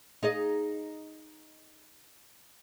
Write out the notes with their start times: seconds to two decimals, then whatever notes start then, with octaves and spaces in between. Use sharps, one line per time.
0.23 D#4 G#4 D#5